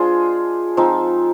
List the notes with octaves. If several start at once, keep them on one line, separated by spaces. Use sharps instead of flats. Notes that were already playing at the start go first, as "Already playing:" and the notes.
Already playing: G#3 D4 F4 G#4 C5
F3 C4 D#4